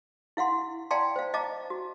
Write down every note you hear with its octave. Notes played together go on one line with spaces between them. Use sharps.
E4 F5 F#5 C6
D5 F5 G5 A5 A#5 C6
C5 F5
D#5 F5 A5 A#5 D6
F#4